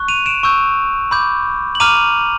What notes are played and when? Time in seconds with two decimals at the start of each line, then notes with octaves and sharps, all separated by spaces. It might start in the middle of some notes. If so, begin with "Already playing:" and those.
Already playing: C#6 F#6
0.08 D#7 F7
0.26 D7 E7
0.43 C#6 E6 G6
1.11 B5 D6 G6
1.75 F#7
1.80 A#5 D6 F6 D#7 F7